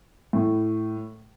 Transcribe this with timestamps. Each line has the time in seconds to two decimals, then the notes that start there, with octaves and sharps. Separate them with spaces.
0.33 A2